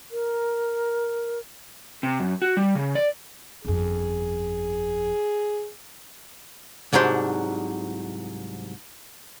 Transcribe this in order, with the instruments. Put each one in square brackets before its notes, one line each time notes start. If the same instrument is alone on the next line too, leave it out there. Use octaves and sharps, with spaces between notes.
[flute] A#4
[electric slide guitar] C3
F#2
F#4
G3
C#3
D5
[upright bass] G1 F2 [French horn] G#4
[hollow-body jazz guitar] C2 G#2 F#3 D4 C5 C6